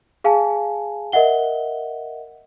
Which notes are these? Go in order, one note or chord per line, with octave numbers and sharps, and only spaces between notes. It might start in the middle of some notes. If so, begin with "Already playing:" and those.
G#4 F5 G#5 A5
A#4 D#5 E5 F#5 G7